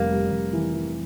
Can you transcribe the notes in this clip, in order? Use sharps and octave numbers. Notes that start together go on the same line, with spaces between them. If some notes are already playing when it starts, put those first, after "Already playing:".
Already playing: F1 G3 A#3
G3
F1
E3
E3